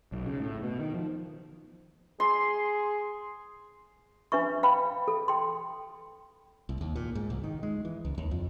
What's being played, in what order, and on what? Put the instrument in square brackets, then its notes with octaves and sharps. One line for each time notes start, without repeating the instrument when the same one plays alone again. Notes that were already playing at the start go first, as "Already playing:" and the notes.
[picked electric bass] B1
C#3
A2
B2
D#3
F3
[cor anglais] G#4 [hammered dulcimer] C6
[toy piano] D4 B4 E5 C#6
B4 F5 G5 B5
A4
G5 C6
[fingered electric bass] C2
D#2
A#2
G#2
C2
D#3
G#3
E3
C#2
D#2
F2